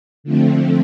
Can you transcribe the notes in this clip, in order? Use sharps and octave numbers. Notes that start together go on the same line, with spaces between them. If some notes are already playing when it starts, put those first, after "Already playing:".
D3 F3 A3 C4